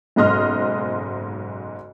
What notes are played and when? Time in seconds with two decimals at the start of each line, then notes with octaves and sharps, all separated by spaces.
0.16 F#1 B1 G#2 D#5 C6 F6